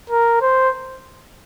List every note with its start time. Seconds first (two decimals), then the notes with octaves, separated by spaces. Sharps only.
0.10 A#4
0.42 C5